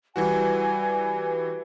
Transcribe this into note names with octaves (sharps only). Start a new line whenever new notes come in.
E3 G3 E4 F#4 B4 G#5